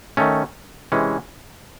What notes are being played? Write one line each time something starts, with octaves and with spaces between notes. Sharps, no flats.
D#3 A3 C#4
C3 E3 G#3 C#4